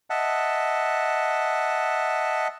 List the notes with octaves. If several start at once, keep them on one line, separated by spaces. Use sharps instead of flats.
D#5 E5 F#5 A5